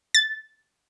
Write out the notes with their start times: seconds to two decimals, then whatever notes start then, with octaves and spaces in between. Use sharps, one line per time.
0.14 A6